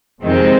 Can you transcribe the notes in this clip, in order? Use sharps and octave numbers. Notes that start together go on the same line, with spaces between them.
F2 C3 D#3 G#3 C4